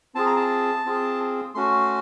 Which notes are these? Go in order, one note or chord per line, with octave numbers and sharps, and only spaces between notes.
C4 F4 G#4 A5
A#5
A5
C4 F4 G#4
A3 C#4 F#4 C6